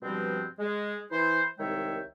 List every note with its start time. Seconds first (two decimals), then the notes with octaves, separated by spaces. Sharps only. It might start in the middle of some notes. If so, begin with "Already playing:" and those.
0.02 G2 B2 F3 G3 G#3 C4
0.59 G#3
1.11 E3 E4 C5
1.59 C2 D#3 G#3 C#5 E5 G5